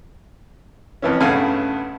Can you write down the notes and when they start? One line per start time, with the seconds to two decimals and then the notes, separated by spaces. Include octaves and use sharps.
1.02 F2 E3 C#4
1.20 B1 G2 C#3 A3 F5 G#5